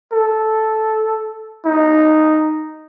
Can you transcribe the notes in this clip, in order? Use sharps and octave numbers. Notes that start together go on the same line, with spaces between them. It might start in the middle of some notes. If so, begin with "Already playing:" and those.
A4
D#4